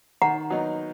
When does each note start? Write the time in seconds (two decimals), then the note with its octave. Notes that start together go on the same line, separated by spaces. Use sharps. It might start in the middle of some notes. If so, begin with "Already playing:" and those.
0.22 D#3 F#5 A#5
0.50 F#3 B3 D#4